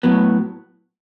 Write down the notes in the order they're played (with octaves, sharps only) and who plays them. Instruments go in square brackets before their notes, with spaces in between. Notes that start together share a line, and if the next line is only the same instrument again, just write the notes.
[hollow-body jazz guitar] A2 F#3 B3